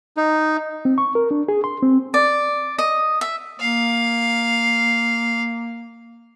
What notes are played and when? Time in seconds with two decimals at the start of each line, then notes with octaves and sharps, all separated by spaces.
0.17 D#4
0.85 C4
0.98 C#6
1.15 A#4
1.31 D4
1.48 G#4
1.64 C6
1.83 C4
2.14 D5
2.78 D#5
3.21 E5
3.60 A#3 F5